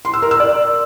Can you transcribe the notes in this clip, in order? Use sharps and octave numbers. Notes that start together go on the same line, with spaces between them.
C6
E6
A#4
E6
D5